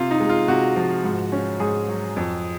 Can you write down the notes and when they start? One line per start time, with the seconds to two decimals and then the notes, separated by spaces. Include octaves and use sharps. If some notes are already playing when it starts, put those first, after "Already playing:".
Already playing: C3 F4
0.11 D#4
0.20 G#3
0.29 F4
0.48 C3 F#4
0.76 F3
1.04 G#2
1.32 C#4
1.60 G#2 G#4
1.88 F#3
2.16 F2